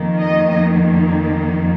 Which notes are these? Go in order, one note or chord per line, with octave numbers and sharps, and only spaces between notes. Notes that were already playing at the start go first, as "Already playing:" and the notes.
Already playing: F2 D#3 A#3
D#5